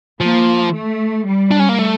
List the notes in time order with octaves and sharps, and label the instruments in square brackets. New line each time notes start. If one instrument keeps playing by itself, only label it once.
[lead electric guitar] F3 [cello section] A#3
[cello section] A3
G3
[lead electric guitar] D4
C#4
A#3
A3